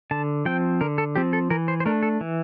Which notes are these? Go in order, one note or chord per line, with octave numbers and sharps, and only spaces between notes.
D3 A5
F3 C4 G5
D3 A#4
A4
F3 C4 G4
A4
E3 A#4
C5
C5
A3 D4 A#4
A4
E3